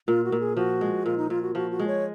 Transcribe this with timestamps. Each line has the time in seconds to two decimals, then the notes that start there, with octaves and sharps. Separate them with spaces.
0.08 A#2 F4
0.24 F#4
0.32 A#2
0.40 G#4
0.56 F3 F#4
0.81 G#3
1.06 A#2 F4
1.17 D#4
1.30 A#2 F4
1.42 F#4
1.55 F3 F#4
1.71 F#4
1.80 G#3
1.87 C#5